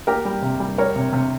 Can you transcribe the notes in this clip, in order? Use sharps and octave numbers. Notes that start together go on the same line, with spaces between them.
A#3 G4 A#4
G3
C3
G3
G3 A#4 C#5
C3
C3